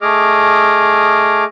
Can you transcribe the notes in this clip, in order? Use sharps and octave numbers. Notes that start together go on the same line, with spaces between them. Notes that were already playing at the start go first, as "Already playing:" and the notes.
A3 G#4 D#5 D6 F6